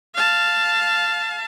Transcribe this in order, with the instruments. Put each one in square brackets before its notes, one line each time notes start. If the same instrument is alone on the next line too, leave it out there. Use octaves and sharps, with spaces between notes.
[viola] F5 A5